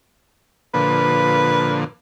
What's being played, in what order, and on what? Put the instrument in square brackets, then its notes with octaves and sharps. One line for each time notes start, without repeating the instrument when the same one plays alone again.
[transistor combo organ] A#2 D3 F3 [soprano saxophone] B4